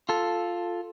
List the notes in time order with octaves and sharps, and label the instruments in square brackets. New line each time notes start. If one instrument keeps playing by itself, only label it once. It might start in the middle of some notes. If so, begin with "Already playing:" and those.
[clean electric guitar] F4 A4